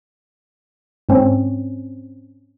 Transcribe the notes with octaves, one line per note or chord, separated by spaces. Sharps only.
G#2 C4 C#4